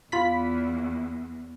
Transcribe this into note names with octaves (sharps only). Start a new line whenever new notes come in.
E2 F4 B5 B6